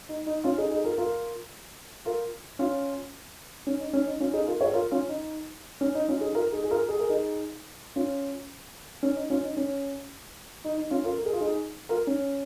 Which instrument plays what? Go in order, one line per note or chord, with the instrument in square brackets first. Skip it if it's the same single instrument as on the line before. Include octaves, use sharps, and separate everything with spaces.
[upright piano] D#4
D#4
C#4 F4
D#4 G#4
D#4 G#4
F4 A#4
F4 A#4
F4 A#4
C#4 F4
C#4
D#4
C#4
D#4
C#4 F4
D#4 G#4
F4 A#4
G#4 C#5
F4 A#4
C#4 F4
D#4
C#4
D#4
C#4 F4
D#4 G#4
F4 A#4
D#4 G#4
G#4
F4 A#4
G#4
A#4
D#4 G#4
C#4 F4
C#4
D#4
C#4 F4
D#4
C#4
D#4
D#4
C#4 F4
F4 A#4
A#4
G#4
F4
D#4 G#4
F4 A#4
C#4